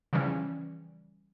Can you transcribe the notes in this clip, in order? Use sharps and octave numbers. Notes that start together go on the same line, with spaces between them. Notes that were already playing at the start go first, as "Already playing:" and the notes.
C#3 E3 F3 G3 C#4